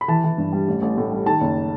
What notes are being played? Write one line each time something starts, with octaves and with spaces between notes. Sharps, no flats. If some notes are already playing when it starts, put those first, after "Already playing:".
B5
E3 A5
E3
G2
G3
A1
A1
A2
G3
D#3 A5
F#1